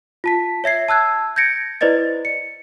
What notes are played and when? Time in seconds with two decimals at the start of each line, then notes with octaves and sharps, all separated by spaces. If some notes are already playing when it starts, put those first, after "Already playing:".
0.24 F4 A5 B6
0.64 C#5 E5 G#6 C7
0.88 A5 E6 F#6 G#6
1.36 G6 G#6 A#6 C#7 D7
1.81 E4 B4 C5 D5 D#5 A6
2.25 C#7